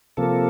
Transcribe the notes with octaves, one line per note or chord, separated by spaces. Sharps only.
C3 F3 A#3 A4